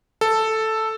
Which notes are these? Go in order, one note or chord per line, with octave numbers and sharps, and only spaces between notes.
A4